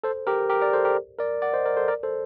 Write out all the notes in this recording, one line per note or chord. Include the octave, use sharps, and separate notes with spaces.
A4 C5
G4 A#4
G4 A#4
A#4 D5
A4 C5
G4 A#4
A#4 D5
D5 F#5
C5 D#5
A#4 D5
A4 C5
A#4 D5
A4 C5